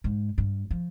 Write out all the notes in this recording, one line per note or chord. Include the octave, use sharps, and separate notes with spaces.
G#2
G2
F3